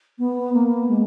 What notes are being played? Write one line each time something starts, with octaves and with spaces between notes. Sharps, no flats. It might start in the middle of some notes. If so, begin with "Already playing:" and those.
B3
A#3
G#3